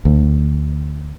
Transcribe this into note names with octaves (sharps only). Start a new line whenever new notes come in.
D2